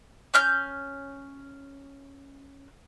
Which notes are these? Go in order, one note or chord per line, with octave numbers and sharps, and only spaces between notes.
C#4 F6 G6